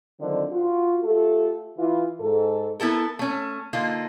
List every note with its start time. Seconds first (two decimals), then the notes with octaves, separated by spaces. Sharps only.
0.20 D3 D#3 F3 F#3 C4 D4
0.51 F4 F#4
1.03 A3 F4 G4 A4
1.78 E3 E4 F4
2.20 G#2 A4
2.80 B3 E4 A4 A#4
3.19 A3 C#4
3.73 D3 A#3 D#4 F4